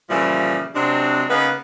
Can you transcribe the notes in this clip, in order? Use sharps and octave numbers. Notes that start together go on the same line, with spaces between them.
A#2 C#3 E3 F3 G3 E4
C3 F#3 G#3 C4 D4
C#3 A#3 B3 D#4 B4